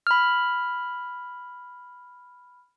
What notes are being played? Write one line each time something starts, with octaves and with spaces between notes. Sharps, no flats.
B5 F6